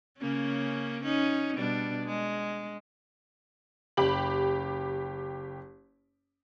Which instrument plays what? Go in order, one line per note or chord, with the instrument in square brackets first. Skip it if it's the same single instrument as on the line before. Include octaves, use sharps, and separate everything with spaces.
[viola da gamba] C#3 A#3 C#4
C#4 D#4
B2 G3 D4
G#3
[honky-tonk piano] F#1 G4 B5 F#7